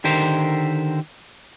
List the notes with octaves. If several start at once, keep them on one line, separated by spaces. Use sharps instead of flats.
D3 D#3 G4 A#4 C5